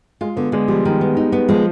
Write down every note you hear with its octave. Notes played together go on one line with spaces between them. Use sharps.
G#3 F4
D3 B3
D3 G#3
F3 G3
D#3
B3
D#4
B3
F3 G#3